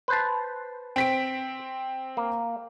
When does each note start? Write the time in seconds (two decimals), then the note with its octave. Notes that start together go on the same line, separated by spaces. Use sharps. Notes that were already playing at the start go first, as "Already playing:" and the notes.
0.08 B4 C5 A5
0.96 C4 B6 D7
2.17 A#3